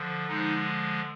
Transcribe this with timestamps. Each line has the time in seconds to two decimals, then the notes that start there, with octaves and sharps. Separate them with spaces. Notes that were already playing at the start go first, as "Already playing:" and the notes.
Already playing: D3 F3
0.28 D3 F3 G#3 D#4